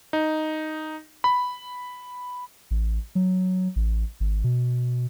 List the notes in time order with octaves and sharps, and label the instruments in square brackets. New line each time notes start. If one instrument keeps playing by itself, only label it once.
[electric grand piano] D#4
B5
[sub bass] A1
F#3
A1
G#1
B2